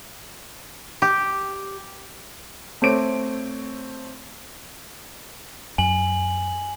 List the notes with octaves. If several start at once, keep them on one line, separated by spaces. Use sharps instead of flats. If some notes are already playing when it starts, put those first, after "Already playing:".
G4
A3 C4 C#5 D6 D7
F#2 G#5 F#7